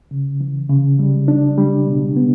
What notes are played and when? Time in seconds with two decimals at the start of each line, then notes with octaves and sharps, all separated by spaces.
0.11 C#3
0.41 E3
0.70 C#3
0.99 G3
1.28 D4
1.58 G3
1.87 B2
2.16 B3